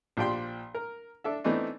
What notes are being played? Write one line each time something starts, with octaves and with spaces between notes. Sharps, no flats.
A#1 F3 G4 D5 G5 C6
A#4
D4 A4 E5
E3 A3 B3 C4 D4 D#4